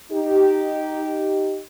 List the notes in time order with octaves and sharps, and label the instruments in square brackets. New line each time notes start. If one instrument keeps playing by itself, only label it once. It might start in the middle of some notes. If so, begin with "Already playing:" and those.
[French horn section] D#4 G4